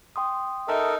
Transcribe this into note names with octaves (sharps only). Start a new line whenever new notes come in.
G5 C6 D#6
D#4 A4 A#4 E5